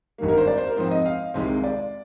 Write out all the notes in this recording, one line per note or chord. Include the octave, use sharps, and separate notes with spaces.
G#1 G2 D#3 A#3
A#4
C5
D5
C5
A#4
G#2 F3 C4 C5
D#5
F5
C2 C3 D#3 G#3 C4
D5